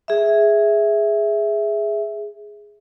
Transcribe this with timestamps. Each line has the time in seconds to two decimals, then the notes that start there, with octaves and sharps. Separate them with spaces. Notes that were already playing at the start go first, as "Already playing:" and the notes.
0.08 G#4 E5